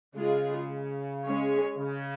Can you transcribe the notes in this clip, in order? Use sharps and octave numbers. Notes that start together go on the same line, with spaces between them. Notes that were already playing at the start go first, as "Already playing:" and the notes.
C#3 G#3 F4 G#4
G#3 C#4 G#4 C#5
C#3